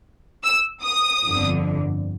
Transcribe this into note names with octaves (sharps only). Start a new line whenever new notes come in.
E6
D#6
G1 F2 D3